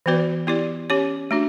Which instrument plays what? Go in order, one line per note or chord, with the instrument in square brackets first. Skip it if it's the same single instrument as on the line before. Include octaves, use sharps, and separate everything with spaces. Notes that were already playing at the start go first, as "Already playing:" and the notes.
[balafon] E3 B3 F#4 B4 D5
B3 E4 G4 D5
C#4 G4 C#5
A3 D4 F#4